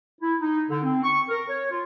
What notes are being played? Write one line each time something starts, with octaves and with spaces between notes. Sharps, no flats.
E4
D#4
D3
C4
C#6
A#4
C#5
F4